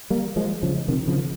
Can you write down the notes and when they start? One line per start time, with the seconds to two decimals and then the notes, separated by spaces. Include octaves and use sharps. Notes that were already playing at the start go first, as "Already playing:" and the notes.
0.10 G3 A#3
0.36 F3 G#3
0.63 C#3 F3
0.88 C3 D#3
1.07 C#3 F3